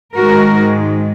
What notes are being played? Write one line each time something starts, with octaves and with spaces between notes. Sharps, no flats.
G#2 D#3 G#3 F#4 A#4